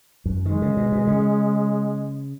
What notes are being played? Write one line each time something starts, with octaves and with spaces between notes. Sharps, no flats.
F#2
D#3 G#3
C#3
B2
B2
C#3